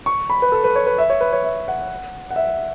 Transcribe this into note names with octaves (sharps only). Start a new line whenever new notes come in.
C#6
B5
B4
A4
B4
C#5
B4
E5
C#5
B4
C#5
E5
F#5
F#5
E5